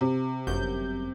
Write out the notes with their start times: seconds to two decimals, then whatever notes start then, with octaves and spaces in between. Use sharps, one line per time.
0.01 C3
0.47 G1 F#2 G6